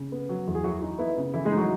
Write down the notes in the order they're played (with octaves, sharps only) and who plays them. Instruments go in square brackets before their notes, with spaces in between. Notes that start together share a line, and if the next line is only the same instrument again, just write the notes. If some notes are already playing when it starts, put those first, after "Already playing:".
Already playing: [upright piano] C#3
B3
F#3
E2
G#4
E3 F#3 F#4
D#4
B3 E4
C#3
E3 E4
G#3 G#4
D#4
F#3 F#4